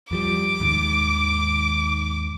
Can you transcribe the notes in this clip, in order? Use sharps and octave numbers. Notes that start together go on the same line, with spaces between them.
F2 F3 G3 D6
D#2 G#2 D#3